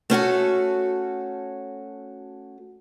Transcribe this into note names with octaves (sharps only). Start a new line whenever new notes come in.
A3 C#4 F#4 A4